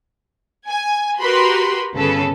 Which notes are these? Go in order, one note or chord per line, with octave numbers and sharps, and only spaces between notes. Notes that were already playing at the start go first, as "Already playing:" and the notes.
G#5
F#4 G4 A#4 B4 B5 C6
G1 C#3 A4 B4